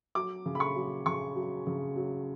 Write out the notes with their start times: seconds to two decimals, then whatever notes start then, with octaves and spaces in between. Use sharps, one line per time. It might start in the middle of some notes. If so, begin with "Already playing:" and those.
0.15 F#3 D6
0.46 C#3
0.55 B5
0.60 C#6
0.76 F#3
1.06 C#3 C#6
1.36 F#3
1.67 C#3
1.96 F#3